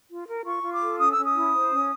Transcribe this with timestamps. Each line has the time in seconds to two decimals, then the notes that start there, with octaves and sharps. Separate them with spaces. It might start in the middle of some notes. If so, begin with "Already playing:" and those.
0.10 F4
0.29 A#4
0.46 F4 C#6
0.63 F4
0.73 D6
0.81 A4
0.99 C#4 D#6
1.13 C#4 E6
1.25 D#6
1.34 E4
1.53 C5
1.70 C#4